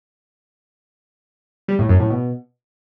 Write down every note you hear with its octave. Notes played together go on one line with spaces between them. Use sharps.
G3
A2
F#2
A2
B2